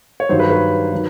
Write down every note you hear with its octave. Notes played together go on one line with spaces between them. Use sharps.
C#5
G2 D#3 F#3 C5
B4
B4
D#3 F#3